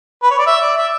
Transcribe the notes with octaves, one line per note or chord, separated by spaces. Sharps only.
B4
C#5
D5
E5
D5
E5